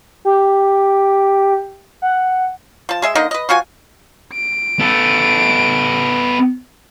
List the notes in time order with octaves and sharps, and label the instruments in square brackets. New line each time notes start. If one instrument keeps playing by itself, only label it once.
[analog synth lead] G4
F#5
[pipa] F3 A5
G#3 G#4 E5
D3 A#3 D#4 D#5
B4 D#5
F3 F4 F#4 G#5
[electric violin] D7
[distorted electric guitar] B3 A4